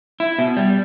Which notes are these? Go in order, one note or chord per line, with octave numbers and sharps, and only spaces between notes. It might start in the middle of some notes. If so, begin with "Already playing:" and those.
E4
B2
G3